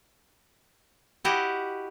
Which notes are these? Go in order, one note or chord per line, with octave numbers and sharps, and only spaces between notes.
E4 F#4 G4 D#5